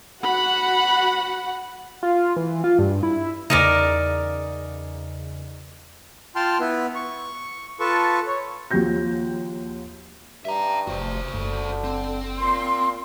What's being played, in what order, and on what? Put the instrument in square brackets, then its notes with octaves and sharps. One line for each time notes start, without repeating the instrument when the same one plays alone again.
[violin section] F#4 F#5 [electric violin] B5
[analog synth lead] F4
E3
F4
G2
E4
[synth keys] E2 C#3 [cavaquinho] D#4 A#4 D5
[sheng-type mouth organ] F4 G5 A5 C6 F6
B3 E4 B4
C#6
F4 A4 B4 A5 C#6
C#5
[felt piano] D#2 F3 F#4 G4 G6 A#6
[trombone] G2 [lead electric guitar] E5 A#5
[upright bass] F1 [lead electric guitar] F#4 C5
[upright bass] F#1 [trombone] D3
[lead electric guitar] C4
[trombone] A#2 [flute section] C6